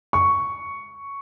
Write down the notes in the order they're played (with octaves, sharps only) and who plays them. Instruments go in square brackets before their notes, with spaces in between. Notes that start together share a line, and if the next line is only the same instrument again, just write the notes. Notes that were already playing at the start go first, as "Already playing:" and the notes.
[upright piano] C#6